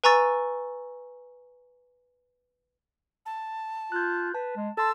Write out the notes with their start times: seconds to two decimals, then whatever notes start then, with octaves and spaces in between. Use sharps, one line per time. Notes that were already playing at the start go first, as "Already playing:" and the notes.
0.04 B4 G#5 A#5 C#6 E6 A6
3.26 A5
3.92 F4 F#6 G6
4.34 B4 A5
4.56 G#3
4.77 A4 A5 C6 E6